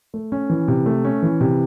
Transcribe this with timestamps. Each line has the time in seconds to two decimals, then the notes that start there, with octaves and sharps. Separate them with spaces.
0.14 A3
0.32 C#4
0.50 E3
0.68 C3
0.86 A3
1.05 C#4
1.22 E3
1.41 C3